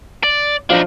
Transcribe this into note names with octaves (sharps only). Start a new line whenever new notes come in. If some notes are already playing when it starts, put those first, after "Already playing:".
D5
F3 D4 D#4 F5